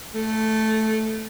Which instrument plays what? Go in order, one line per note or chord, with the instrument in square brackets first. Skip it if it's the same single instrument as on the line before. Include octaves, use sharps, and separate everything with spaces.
[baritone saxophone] A3